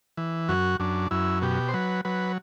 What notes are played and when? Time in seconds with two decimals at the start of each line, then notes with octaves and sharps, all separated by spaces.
0.17 E3
0.49 F#2 F#4
0.80 F#2 D4
1.11 F#2 E4
1.42 B2 G4
1.68 C5
1.74 F#3 B4
2.05 F#3 B4